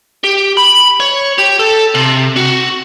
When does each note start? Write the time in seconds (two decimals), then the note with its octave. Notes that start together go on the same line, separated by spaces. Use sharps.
0.24 G4
0.57 B5
1.00 C#5
1.38 G4
1.59 A4
1.95 C3
2.36 F#4